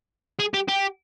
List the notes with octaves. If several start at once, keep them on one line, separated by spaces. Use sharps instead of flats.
G#4
G4
G4